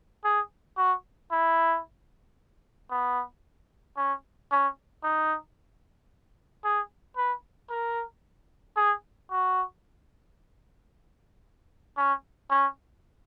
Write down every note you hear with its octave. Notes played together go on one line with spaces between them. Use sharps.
G#4
F#4
E4
B3
C#4
C#4
D#4
G#4
B4
A#4
G#4
F#4
C#4
C#4